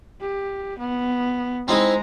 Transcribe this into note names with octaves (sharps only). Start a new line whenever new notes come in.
G4
B3
G#3 C4 D#4 E4 A#5